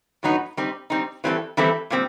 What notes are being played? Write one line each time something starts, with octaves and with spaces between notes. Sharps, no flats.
A2 F#3 B3 D#4
G3 C4 D#4
G3 C4 D#4
E3 G3 C4 E4 A4
E3 G3 C4 E4 A4
A#2 G3 C4